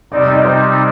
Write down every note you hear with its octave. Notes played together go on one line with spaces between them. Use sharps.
C3 G3 C4 D#4 D5
D5
D#5
C5